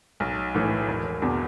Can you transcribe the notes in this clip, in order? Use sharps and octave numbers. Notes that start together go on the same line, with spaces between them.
B1
A2 E3
E1
E2 B2